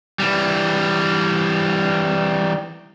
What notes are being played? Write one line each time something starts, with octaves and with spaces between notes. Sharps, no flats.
E3 G3